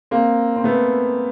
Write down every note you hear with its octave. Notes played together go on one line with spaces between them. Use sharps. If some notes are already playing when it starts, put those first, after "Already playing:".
A#3 C4
C4
A3 B3